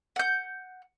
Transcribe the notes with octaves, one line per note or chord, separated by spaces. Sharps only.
F#5 G6